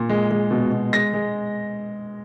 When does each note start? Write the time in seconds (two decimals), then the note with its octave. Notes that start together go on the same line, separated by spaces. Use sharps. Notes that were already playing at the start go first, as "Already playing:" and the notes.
Already playing: A#2
0.09 G#3
0.31 G#3
0.51 B2
0.72 B2
0.93 G#3 A#6
1.14 G#3